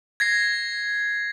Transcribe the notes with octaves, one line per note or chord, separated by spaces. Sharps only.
G#6 A#6 C7